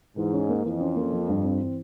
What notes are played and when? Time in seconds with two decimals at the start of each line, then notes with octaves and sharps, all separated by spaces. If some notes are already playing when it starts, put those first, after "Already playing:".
0.17 G#2 E3
0.33 C#4
0.49 A#3
0.64 F2 E3
0.80 C#4
0.96 A#3
1.13 F3
1.29 G2
1.44 C4
1.60 E3